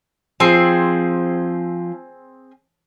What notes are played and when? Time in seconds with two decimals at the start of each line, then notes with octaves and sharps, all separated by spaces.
0.40 F3 C4 G#4 C6